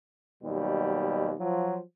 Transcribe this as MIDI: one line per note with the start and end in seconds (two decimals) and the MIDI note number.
0.43 1.33 39
0.43 1.33 47
0.43 1.33 54
0.43 1.33 55
1.39 1.80 53
1.39 1.80 54